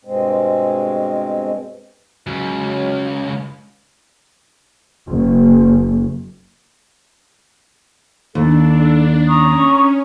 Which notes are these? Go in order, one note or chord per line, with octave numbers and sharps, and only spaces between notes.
G2 B2 G#3 C4
C#2 C#3 F#3
F#1
D#2 D4 A4
C#4 A#5 C#6 D#6